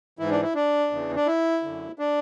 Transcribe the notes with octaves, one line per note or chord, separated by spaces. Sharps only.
G#2 E3 E4
D4
E4
D4
E2 C#3 E3
D4
E4
F#2 D3
D4